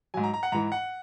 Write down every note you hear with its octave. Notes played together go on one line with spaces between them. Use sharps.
G#2 F#3 G#5
A#5
A#5
F#5
G#2 E3 A#5
F#5